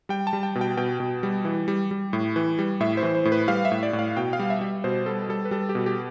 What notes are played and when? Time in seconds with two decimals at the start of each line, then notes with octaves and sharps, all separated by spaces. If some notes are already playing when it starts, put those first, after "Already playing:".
0.09 G3 G5
0.27 A5
0.33 G3
0.43 G5
0.55 B2
0.61 G5
0.77 B2 G5
1.00 B2
1.23 G3
1.45 E3
1.68 G3
1.91 G3
2.13 A2
2.36 E3
2.59 G3
2.80 A2 E5
2.97 C5
3.03 E3
3.15 C5
3.25 A2
3.32 B4
3.48 G3 F5
3.65 E5
3.72 A2
3.83 D5
3.93 A2
3.99 F5
4.17 B2 G5
4.33 F5
4.40 G3
4.50 E5
4.61 G3
4.84 B2 C5
5.06 G3 A4
5.29 G3 A4
5.45 B4
5.51 G3 A4
5.69 G4
5.75 B2
5.86 G4